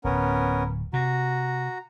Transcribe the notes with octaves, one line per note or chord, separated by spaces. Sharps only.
D1 B3 C#4 A#4
C3 F#4 A#5